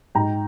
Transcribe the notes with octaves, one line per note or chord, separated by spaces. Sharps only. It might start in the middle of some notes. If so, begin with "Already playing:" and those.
G#2 G5 A#5